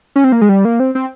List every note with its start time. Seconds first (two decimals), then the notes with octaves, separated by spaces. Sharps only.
0.16 C#4
0.24 C4
0.32 A#3
0.41 G#3
0.49 G3
0.65 A#3
0.80 C4
0.95 C4